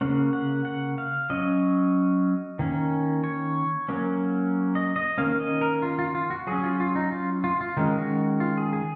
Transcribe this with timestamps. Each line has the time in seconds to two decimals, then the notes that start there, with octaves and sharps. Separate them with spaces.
0.01 C#3 F3 A#3 C#4 F#5
0.33 F#5
0.65 F#5
0.98 F5
1.30 F#3 C#4 D#5
2.59 D#3 A#3 C#4
3.24 C#5
3.89 F#3 A#3 C#4
4.75 D#5
4.96 D#5
5.18 D#3 A#3 C#4 F5
5.40 D#5
5.61 A#4
5.82 F4
5.99 F4
6.15 F4
6.30 F#4
6.47 F#3 C#4 G#4
6.63 F4
6.80 F4
6.95 D#4
7.12 F4
7.44 F4
7.61 F4
7.77 D#3 G#3 C#4 D#4
7.98 F#4
8.40 F4
8.57 G#4
8.73 G#4